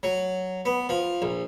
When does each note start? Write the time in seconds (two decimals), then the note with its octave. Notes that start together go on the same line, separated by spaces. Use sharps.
0.03 F#3
0.65 B3
0.89 F3
1.22 A#1